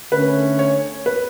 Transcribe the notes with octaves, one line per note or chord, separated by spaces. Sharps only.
D3 A3 C#4 B4
C#5
B4